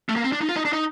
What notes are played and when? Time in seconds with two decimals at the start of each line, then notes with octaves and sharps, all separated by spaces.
0.09 A3
0.16 A#3
0.24 C4
0.32 D4
0.41 D#4
0.49 F4
0.56 D#4
0.65 D4
0.73 D#4